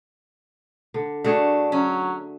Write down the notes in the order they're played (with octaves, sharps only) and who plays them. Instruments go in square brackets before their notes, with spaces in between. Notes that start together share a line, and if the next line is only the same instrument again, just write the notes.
[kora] D3
[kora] A3 F#4 G#4 [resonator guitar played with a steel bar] D4
[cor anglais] F#3 [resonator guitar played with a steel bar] C#4